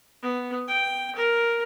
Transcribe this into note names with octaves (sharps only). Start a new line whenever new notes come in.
B3
G5
A#4